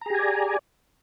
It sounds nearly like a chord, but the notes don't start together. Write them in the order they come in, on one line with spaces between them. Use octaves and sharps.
A#5 G#4 G4 G#5 D5